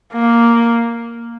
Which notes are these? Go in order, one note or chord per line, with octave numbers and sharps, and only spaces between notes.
A#3